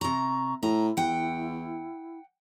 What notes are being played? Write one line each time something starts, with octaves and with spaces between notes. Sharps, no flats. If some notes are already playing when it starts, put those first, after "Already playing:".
C3 A#5 C#6
A2 E4 A#5
E2 F#5 G5